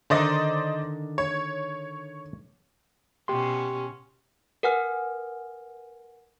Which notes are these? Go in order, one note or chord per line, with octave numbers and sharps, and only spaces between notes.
D3 D#3 D#4 C5 D5 D#5
C#5
B2 C#4 G4 C6
A#4 B4 F#5 G#5 F6